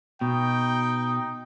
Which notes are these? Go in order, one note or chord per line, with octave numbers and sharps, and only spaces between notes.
B2 D#4 G5